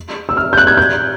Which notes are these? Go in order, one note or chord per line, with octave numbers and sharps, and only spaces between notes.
E6
F6
G6
F#6
G#6
G6